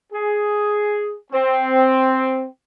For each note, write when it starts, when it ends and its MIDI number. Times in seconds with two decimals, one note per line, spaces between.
0.13 1.15 68
1.33 2.44 60